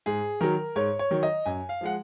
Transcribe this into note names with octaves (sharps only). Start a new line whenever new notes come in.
G#2 G#4
D#3 F#3 A#4
G#2 C#5
C#5
D#3 F#3
D#5
F#2 G#5
F5
F3 G#3 F#5